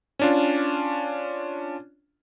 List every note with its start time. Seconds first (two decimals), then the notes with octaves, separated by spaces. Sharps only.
0.19 C#4 D4 F4